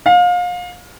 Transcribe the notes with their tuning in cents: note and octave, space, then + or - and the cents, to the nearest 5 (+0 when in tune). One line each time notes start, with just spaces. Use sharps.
F5 +30